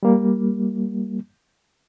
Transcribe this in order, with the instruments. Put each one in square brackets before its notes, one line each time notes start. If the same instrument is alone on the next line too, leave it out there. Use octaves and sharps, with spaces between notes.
[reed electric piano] G3 A#3